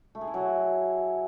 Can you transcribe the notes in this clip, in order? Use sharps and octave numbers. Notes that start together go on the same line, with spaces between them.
A3
G#4
E4
F#3